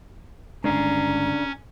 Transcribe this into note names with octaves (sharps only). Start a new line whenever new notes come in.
G1 C#3 G#3 C#4 D4 A#5